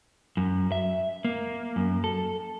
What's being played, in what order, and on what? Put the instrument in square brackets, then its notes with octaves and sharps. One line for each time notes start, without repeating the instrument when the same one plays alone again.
[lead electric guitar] F#2
E5
A#3
F#2
A4